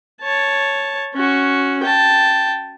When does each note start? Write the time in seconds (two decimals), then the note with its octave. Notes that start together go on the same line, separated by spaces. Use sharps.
0.21 C#5 A5
1.15 C#4 F#4
1.83 G5 A5